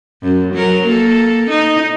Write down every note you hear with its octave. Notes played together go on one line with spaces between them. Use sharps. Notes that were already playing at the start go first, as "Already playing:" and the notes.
F#2
F#3 A#4
A#3 A4
D#4